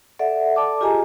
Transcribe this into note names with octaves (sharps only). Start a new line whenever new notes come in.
A4 D5 E5 F#5
A4 D5 A5 D6
F4 G4 G#4 D#5 G#5 A#5